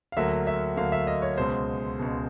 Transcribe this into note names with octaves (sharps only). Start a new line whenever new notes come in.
F5
D2 D3 F#3 A#3 E5
E5
D2 D3 F#3 A#3 F5
E5
D#5
C#5
C#2 B2 G#3 C5
C#2 B2 G#3